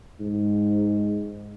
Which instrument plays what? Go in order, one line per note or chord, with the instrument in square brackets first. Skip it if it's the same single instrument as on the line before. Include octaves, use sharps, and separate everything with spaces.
[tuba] G#2